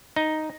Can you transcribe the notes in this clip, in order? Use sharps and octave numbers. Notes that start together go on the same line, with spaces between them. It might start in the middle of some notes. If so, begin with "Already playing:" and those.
D#4